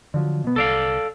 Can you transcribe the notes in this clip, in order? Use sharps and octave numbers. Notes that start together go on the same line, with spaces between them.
D3 F3 F#3
B2 B3
C2 A4 D5 F5